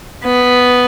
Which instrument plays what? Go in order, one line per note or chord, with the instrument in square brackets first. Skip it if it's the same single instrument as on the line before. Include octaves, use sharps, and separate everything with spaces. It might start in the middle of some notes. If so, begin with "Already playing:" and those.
[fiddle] B3